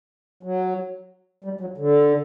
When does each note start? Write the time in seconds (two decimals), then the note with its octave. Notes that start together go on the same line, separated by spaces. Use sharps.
0.43 F#3
1.44 G3
1.61 F#3
1.77 D3